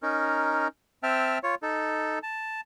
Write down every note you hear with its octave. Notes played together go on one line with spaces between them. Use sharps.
C#4 D#4 A#4
C4 E5 G5 A5 F6
F4 C#5
D#4 A4
A5